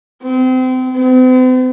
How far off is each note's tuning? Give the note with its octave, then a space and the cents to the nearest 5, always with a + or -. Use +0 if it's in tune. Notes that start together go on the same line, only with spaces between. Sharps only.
C4 -30
C4 -45